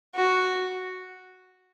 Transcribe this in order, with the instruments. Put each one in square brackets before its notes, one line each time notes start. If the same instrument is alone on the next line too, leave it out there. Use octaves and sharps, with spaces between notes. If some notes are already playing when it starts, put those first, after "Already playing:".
[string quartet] F#4